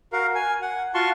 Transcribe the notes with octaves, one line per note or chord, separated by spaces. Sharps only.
F#4 A#4 F5
G#5
F#5
F4 F#4 A5 C6 C#6